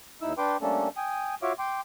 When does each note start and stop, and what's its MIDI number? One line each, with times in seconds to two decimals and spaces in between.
0.22 0.33 39
0.22 0.33 63
0.22 0.33 64
0.22 0.33 88
0.38 0.57 62
0.38 0.57 71
0.38 0.57 79
0.38 0.57 84
0.38 0.57 86
0.62 0.89 55
0.62 0.89 57
0.62 0.89 58
0.62 0.89 61
0.62 0.89 62
0.62 0.89 69
0.97 1.35 79
0.97 1.35 80
0.97 1.35 87
1.43 1.53 65
1.43 1.53 66
1.43 1.53 73
1.43 1.53 76
1.43 1.53 77
1.43 1.53 86
1.59 1.81 79
1.59 1.81 84
1.59 1.81 86